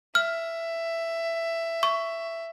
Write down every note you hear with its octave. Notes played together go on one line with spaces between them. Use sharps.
E5 F6
C#6